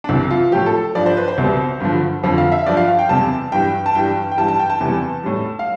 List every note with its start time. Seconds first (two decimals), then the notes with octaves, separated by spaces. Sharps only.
0.04 D4
0.09 C2 C3 E3 E4
0.31 F4
0.52 A2 F3 G4
0.66 A4
0.95 G2 F3 D5
1.06 C5
1.17 B4
1.28 C5
1.38 C2 B2 G3
1.80 G2 D3 F3
2.23 F2 D3 F3
2.38 F5
2.52 E5
2.66 G2 F3 D5
2.77 F5
2.88 F5
2.99 G5
3.09 E2 C3 G3 A5
3.52 G2 E3 G3 G5
3.86 A5
3.95 G2 E3 G3 G5
4.32 G5
4.37 G2 E3 G3 A5
4.48 A5
4.59 G5
4.70 A5
4.81 E2 C3 E3 G3
5.23 A2 G3
5.59 F5